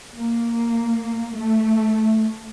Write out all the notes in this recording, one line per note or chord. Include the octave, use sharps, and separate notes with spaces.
A#3
A3